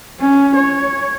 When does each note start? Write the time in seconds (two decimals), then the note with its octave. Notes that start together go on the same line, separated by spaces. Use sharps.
0.20 C#4
0.56 C#5